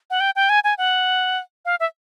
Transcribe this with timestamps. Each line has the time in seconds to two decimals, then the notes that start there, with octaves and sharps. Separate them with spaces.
0.10 F#5
0.20 G5
0.36 G5
0.49 G#5
0.64 G#5
0.78 F#5
1.65 F5
1.80 E5